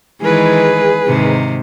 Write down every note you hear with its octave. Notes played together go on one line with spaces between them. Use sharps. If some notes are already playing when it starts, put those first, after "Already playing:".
D#3 E3 G#3 G#4 B4
G#2 C3 D#3